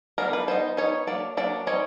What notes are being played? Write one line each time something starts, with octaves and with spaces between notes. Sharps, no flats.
E3 G3 B3 D4 A#4
B4
G3 B3 D#4 C5
G3 B3 D#4 C#5
F#3 A#3 D4 D5
F#3 A#3 D4 D5
G3 C4 D#4 C#5